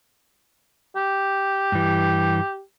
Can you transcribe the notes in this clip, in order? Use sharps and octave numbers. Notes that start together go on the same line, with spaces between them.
G4
G2 E3